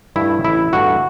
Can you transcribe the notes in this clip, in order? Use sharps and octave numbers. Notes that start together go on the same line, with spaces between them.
G2 D3 A3 E4
A1 E4
G2 D3 A3 F#4